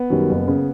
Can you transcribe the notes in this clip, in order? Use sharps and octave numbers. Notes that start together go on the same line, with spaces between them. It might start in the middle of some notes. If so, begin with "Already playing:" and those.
Already playing: B3
F#2 D#3 G3
F#1
C#3